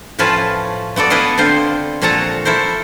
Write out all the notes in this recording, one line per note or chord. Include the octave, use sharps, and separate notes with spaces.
A2 F3 C#4 F4 B4 A5
B3 F#4 A4 D5
B3 E4 A4 B4 D#5 F5
D3 C4 F4 C5
A#2 F3 F#4 A4 A5 A#5
E4 A4 A#4 C5